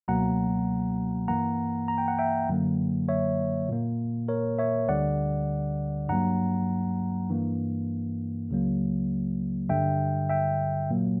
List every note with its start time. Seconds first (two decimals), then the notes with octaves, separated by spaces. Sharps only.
0.08 C#2 B2 F#3 A#3 F#5 A#5
1.28 G2 E3 A#3 F#5 A#5
1.88 A#5
1.98 G5
2.08 F#5
2.19 E5 G5
2.49 F#2 D3 F#3 A#3
3.09 C#5 E5
3.69 A#2 A#3
4.28 A#4 C#5
4.59 C#5 E5
4.88 D2 D3 G3 D5 F#5
6.09 G2 F#3 A#3 F#5 A#5
7.29 G2 E3 A#3
8.50 C#2 C#3 F#3 A#3
9.69 G2 D3 G3 E5 G5
10.30 E5 G5
10.90 A#2 F#3 A#3